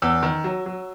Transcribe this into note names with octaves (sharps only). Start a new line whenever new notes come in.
E2 E6
D#3
F#3
F#3